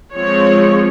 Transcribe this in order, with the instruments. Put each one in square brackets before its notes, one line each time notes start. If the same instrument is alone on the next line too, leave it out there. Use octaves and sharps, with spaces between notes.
[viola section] F3 G#3 C4 C#5